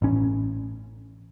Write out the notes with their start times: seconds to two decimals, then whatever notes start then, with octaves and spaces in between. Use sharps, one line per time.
0.02 A1 C#4